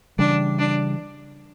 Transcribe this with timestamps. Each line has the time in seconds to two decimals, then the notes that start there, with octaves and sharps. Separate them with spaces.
0.19 C#3 E3 G3 D4
0.59 D4